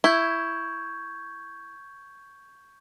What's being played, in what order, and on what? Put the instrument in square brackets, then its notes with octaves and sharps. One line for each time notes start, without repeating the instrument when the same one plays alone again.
[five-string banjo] E4 [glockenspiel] C#6 G6 G#6